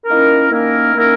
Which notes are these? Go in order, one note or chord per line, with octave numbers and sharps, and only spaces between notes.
D#3 A#3 C#4 E4 A#4
D#3 A#3 C#4 E4 A#4
D#3 A#3 C#4 E4 A#4